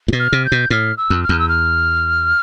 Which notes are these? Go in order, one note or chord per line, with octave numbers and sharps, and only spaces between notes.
A2
B2
F6
C3
G6
B2
A2 F6
E6
F2
F6
E2
E6
F6